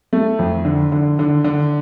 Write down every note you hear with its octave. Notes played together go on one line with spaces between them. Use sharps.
A3
F2
D3
D3
D3
D3